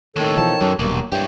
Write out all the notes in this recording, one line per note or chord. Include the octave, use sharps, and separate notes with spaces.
D#2 A2 D#3 A4 C#5
B2 E3 F3 A5
F#2 F#3 C#4
D#1 B1 G2 A#3
G2 E4 G4 C#5 G5